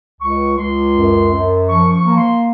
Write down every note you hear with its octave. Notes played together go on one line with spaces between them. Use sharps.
C#2 C#6
C#2 C6
F#2
F#2
F3 C#6
C#6
A#3
C6